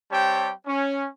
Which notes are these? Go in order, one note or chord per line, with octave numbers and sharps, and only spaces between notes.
G3 C4 G4 C#5 G5 A5
C#4